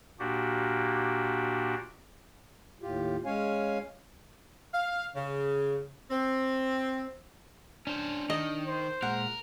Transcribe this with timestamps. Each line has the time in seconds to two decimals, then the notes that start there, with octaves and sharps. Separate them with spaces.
0.19 A#2 A#3 D4 F#4 G4
2.82 D#2 A2 F4 G4
3.25 G#3 C#4 C#5 F5 G#5
4.73 F5
5.15 C#3
6.10 C4
7.87 C#4 D4 C5
8.30 D#3 D#5
8.66 C5
9.02 A#2 G#3 A#4 F#5